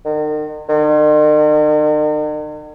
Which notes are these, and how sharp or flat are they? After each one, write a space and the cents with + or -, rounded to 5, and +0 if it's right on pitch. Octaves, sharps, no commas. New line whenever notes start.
D#3 -40
D#3 -45